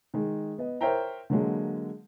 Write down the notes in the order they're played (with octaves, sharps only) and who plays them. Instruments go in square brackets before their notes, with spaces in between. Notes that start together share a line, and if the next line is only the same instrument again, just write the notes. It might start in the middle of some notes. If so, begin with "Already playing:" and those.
[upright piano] D#3 G#3
B3 D#5
A#4 C5 C#5 E5 G5 A#5
D3 F#3 G#3 A#3